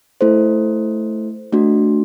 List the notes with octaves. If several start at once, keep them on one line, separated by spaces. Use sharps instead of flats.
A3 E4 A4 C5
A3 D4 F#4